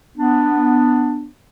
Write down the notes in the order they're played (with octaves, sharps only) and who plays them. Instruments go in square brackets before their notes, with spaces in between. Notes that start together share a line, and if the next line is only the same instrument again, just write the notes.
[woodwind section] B3 D4